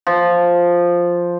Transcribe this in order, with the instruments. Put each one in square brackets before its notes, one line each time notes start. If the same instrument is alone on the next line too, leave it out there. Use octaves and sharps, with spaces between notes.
[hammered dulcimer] F3